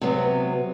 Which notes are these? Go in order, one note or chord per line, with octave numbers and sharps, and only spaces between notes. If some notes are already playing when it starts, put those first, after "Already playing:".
C3 F#3 B3